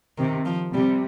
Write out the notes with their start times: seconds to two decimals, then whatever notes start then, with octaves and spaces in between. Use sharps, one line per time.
0.18 C3 D#3
0.46 F3
0.74 C3 G3